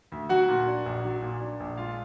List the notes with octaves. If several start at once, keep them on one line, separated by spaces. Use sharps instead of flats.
D2
F#3 F#4 F#5
A#2
D4
A#1
F#3
A#2
D4
A#1
G#3 F4 F5